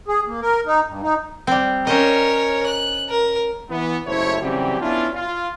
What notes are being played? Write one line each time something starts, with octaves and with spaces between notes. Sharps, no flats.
G#4
A#3
A#4
D#4
G2
D#4
G3 C4
C#4 A#4 C5 C#5 D#5
F#6
A#4
E3 B3
F#1 D#2 A3 E4 C5 C#5
C#3 E3 F#3 G3 C4 G4
B3 C#4 D4 E4 F4
F4